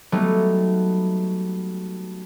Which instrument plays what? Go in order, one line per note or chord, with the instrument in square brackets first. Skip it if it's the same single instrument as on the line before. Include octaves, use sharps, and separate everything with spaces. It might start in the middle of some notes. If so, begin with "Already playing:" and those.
[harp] F#3 G3 A3 B3 D#4